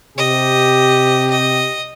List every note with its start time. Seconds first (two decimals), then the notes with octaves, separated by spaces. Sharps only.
0.18 C3 G4 D#5
1.31 D#5